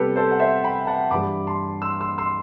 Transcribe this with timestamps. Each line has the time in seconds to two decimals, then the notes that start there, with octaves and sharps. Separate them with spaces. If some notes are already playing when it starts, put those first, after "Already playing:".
Already playing: C3 G3 B3 G4 A4 B4
0.16 A4 C5
0.31 F#5
0.40 C5 E5
0.64 G5 B5
0.83 G5
0.87 F#5 A5
1.11 G2 E3 G3 B5 D6
1.47 A5 C6
1.82 C6 E6
2.01 C6 E6
2.18 C6 E6